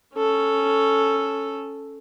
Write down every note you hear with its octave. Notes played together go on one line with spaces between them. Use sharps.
C#4 A4